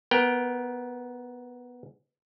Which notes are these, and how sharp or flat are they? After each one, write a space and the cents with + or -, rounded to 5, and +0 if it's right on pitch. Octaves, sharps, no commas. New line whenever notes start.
B3 +0 A#4 +20 G5 +0